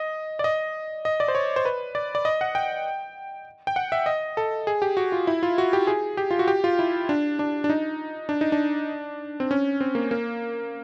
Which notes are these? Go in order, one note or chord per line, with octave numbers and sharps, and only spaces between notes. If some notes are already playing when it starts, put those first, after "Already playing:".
Already playing: D#5
D5
D#5
D#5
D5
C5
C#5
C5
B4
D5
D5
D#5
F#5
G5
G5
F#5
E5
D#5
A4
G#4
G4
F#4
F4
E4
F4
F#4
G4
G#4
G4
F4
F#4
G4
F4
E4
D4
D4
D4
D#4
D4
D#4
D4
C4
C#4
C4
A#3
A#3